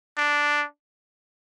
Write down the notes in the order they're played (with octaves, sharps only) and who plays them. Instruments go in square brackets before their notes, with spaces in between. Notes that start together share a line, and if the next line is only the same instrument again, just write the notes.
[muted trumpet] D4